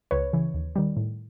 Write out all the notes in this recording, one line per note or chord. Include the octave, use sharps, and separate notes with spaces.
C#2 B4 C#5
C#3 E3
D#2
D#3 G3
A2